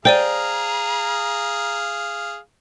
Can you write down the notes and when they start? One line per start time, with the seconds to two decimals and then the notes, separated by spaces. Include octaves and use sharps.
0.05 G#4 C5 D5 F5 G5 A#5 D#7